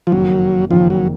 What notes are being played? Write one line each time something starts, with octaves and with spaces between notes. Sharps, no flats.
F3
F#1 F2 D#3 F#3 A#3
F#1 F2 D#3 F3 A#3
F#3